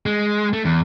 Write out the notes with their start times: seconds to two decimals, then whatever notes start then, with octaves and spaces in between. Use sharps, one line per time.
0.06 G#3
0.53 A3
0.65 E2